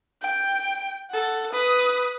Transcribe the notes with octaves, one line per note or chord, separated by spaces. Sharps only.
G5
A4 F#5
B4 D#6